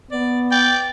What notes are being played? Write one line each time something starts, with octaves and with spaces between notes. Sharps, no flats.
B3 D5
D5 G5